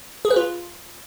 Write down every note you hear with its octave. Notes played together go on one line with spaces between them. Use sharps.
G#4
B4
F4